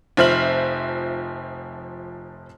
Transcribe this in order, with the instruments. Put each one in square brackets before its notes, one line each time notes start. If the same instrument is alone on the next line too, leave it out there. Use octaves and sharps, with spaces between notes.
[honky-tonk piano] F1 F3 C5 E5 F6 F#7